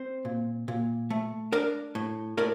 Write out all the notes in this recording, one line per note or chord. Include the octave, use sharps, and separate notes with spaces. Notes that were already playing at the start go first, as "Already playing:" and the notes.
Already playing: C4 C5
A#2
A#2
A3
D4 A#4 D5
A2
A2 A#4 D5